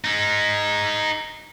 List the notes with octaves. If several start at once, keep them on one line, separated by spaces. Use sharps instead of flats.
D#4 G#4